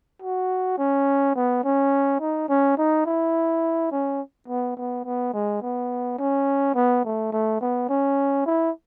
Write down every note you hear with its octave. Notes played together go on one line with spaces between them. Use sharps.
F#4
C#4
B3
C#4
D#4
C#4
D#4
E4
C#4
B3
B3
B3
G#3
B3
C#4
B3
A3
A3
B3
C#4
E4